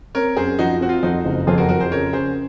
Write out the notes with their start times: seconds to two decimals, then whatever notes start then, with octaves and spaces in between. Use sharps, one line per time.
0.15 C4 A#4 C#5
0.36 F#2 G#4 C5
0.59 F3 D#4 F#4
0.81 C4 F#4
0.89 F4
1.03 F2 D#4 F#4
1.25 F#1
1.47 F2 F4 G#4
1.58 F#4 A#4
1.69 F2 F#4 A#4
1.80 G#4 C5
1.92 C#3 A#4 C#5
2.13 C#4 G#4 C5